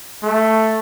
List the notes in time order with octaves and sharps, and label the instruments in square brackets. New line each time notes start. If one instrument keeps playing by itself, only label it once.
[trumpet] A3